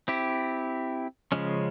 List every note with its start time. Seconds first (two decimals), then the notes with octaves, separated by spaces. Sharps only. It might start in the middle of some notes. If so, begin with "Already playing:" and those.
0.08 C4 E4 G4
1.32 C#3 F3 G#3 C#4